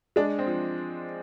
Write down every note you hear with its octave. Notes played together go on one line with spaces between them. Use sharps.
G#3 D4
C4
F3